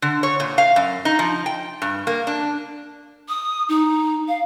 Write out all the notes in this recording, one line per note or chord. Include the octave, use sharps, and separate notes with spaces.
D3
C#5
A#2
F5
F#2
D#4
F3
G5
G2
A#3
D4
D#6
D#4
F5